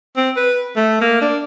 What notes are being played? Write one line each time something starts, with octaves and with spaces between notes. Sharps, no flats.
C4
B4
A3
A#3
D4